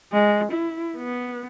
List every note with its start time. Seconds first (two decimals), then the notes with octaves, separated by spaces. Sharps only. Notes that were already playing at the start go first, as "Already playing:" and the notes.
0.13 G#3
0.52 E4
0.97 B3